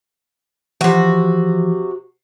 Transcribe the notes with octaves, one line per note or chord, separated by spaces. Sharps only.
C3 E3 F3 F#4